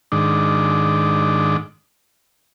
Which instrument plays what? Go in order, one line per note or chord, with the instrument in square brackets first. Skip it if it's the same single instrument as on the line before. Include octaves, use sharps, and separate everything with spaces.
[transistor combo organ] G#2 D#3 D4